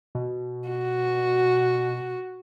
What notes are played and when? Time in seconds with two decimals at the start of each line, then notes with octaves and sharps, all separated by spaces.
0.15 B2
0.68 F#4